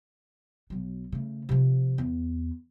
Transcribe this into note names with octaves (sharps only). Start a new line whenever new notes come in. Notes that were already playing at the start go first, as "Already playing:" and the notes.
B1 F#3
C#3 A3
C3 F3
E2